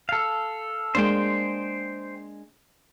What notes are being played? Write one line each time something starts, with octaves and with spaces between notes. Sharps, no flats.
A4 F5
G#3 A#3 D4 C5 G5